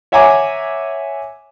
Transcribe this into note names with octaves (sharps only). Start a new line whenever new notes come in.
C#5 E5 F#5 G#5 A#5 D6